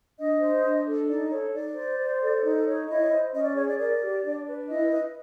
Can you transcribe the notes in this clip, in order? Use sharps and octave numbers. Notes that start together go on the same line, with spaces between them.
D4 D#5
C5
D4
A4
D#4 D5
A4 C#5
D#4 D5
C5
C5
A4
D#4
C#5
E4 D#5
C5
C#4 D#5
D5
G#4 C#5
D5
A#4 D5
G4
D4
B4
E4 D#5
B4